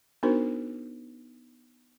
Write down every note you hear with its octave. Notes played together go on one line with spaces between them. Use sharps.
B3 D4 D#4 F#4 A#4 C5